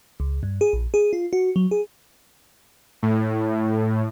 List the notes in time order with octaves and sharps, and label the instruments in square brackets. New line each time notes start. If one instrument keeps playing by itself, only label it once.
[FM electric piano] C#2
G2
G#4
A#1
G#4
F4
F#4
F#3
G#4
[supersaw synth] A2